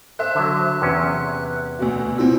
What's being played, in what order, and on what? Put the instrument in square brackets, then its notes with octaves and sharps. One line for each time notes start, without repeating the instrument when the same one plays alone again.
[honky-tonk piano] C5 E5 [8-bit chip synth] F#6
[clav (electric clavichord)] D3 F#3
E2 C3 C#4
[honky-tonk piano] D2 B2 F#4
[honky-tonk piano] B2 C4 [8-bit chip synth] E4 F4 E6